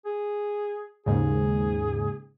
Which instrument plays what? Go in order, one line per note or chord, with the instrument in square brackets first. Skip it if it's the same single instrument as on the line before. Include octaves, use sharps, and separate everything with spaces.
[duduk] G#4
[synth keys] D#2 G#2 C#3 [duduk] G#4